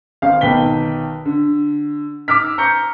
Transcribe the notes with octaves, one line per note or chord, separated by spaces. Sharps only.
G#1 F5
B1 D#3 B4 G5 B6 G7
D3
D6 E6 F6 B6
A#5 C#6 G6 C#7